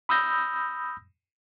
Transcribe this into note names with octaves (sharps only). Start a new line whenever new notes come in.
B5 D#6 E6 G6 A#6